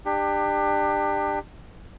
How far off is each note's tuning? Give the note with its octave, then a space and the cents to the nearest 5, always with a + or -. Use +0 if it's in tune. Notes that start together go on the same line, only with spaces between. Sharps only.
D4 +30 G4 +20